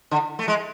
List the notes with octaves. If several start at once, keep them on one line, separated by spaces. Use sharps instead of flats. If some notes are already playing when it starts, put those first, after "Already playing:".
D3
A3
G#3